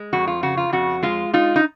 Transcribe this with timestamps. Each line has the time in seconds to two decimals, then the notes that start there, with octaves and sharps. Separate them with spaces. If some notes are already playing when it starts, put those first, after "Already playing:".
Already playing: G#3
0.13 F2 F#4
0.27 F4
0.43 C#3 F#4
0.57 F4
0.72 F2 F#4
1.03 G#3 F4
1.33 D#4 F4
1.56 D#4